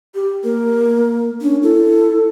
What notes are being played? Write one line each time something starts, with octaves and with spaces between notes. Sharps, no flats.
G4
A#3 A#4
C#4 D4
E4 A4